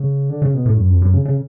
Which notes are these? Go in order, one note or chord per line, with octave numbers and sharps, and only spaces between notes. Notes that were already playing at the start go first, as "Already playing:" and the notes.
Already playing: C#3
D3
C#3
B2
A2
F#2
F2
F#2
C#3
C#3